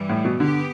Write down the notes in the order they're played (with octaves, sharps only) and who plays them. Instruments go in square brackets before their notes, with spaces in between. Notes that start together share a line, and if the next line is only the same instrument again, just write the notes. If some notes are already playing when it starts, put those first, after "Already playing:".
Already playing: [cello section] G2 E3 G3
[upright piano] A2
B2
[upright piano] D3 [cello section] B3 G4